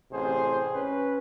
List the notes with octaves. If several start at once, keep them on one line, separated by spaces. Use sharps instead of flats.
A1 C3 G#4 C5
C#4 B4